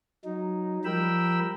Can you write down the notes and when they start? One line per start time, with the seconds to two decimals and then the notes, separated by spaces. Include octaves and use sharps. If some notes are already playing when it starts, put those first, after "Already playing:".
0.25 F#3 D#4
0.85 F3 G3 A#4 G5 B5 E6